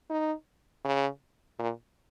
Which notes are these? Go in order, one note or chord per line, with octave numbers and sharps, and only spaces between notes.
D#4
C#3
A#2